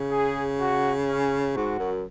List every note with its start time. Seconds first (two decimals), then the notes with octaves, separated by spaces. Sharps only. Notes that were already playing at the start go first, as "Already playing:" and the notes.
Already playing: C#3
0.12 G#4
0.59 F#4
1.08 C#4
1.55 G#2 F#4
1.79 F#2